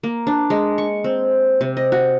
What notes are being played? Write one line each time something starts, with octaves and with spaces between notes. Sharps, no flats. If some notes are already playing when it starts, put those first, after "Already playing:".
A#3
D4
G#3
C#6
C4
C3
D#5
F#4